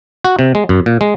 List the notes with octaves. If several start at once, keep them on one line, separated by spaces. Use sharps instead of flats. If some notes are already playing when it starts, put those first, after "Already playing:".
F#4
C3
G#3
F#2
A#2
G#3